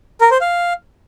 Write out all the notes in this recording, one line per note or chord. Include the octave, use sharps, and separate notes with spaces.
A#4
C5
F5